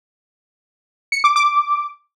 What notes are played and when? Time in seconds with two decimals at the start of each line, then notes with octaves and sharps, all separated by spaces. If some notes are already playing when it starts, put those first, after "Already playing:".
1.12 C#7
1.24 D6
1.36 D6